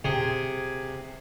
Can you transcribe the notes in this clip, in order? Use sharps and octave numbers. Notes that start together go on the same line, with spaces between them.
C3 G#4 G#5